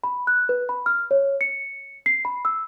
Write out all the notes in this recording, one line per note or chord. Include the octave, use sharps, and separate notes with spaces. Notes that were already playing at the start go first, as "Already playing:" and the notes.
B5
F#6
B4
B5
F6
C#5
C#7
C7
B5
E6